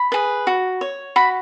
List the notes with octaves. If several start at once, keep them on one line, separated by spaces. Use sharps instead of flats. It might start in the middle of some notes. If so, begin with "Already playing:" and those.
Already playing: B5
G#4 B4
F#4
C#5
F#4 B5